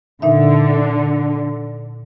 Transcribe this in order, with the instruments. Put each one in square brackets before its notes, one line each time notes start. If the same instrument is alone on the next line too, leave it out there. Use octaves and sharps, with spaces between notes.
[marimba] A#2 D#4 E5 [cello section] D3